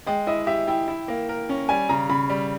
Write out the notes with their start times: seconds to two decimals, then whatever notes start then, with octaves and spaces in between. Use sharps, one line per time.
0.07 G#3 G5
0.27 E4 D#5
0.47 G4 E5
0.67 E4 G5
0.88 E4
1.08 A#3
1.29 A#4
1.49 C#4
1.69 G3 G#5
1.89 C#3 A#5
2.09 C#3 B5
2.30 G3